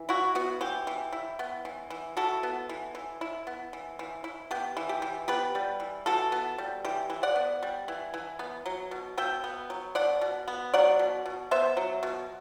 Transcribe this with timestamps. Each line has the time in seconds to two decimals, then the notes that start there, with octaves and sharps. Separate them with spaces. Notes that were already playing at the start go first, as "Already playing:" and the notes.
Already playing: E3
0.09 E4 F#4
0.35 B3 F#4
0.61 E3 G4
0.87 E3
1.12 E4
1.39 B3
1.65 E3
1.90 E3
2.17 E4 F#4 A4
2.43 B3
2.69 E3
2.95 E3
3.21 E4
3.47 B3
3.73 E3
3.99 E3
4.24 E4
4.51 B3 G4
4.77 E3
4.89 G4
5.02 E3
5.28 B3 G4 B4
5.55 G3
5.80 E3
6.06 E3 F#4 A4
6.32 B3
6.58 G3
6.85 E3 G4
7.10 E3
7.23 D5 F#5
7.36 B3
7.63 G3
7.88 E3
8.14 E3
8.39 B3
8.66 F#3
8.91 B2
9.17 B2 E5 G5
9.44 B3
9.70 F#3
9.95 B2 D5 F#5
10.21 B2
10.48 B3
10.74 F#3 D5 F#5
10.99 B2
11.26 B2
11.51 B3 C5 E5
11.77 F#3
12.03 B2